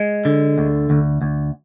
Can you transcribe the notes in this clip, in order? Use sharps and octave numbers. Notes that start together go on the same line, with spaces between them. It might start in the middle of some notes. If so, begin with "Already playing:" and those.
Already playing: G#3
D3
D2
D2
D2